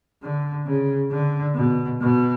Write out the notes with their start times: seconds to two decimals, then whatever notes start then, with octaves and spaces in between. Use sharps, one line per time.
0.23 D3
0.67 C#3
1.12 D3
1.56 B2
2.01 B2